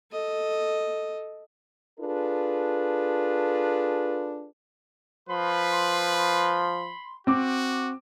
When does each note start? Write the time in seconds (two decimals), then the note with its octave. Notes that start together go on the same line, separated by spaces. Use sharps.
0.12 A4 D#5
2.00 D4 F4 G#4 A4 B4
5.29 F3 B4 B5 C6
7.27 C4 F#4 D6